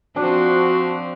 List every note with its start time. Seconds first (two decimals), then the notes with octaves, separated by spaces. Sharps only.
0.16 F3 C4 D4 F#4